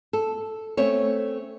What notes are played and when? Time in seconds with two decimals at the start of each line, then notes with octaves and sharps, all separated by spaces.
0.13 A4
0.77 A3 C4 C#4 C#5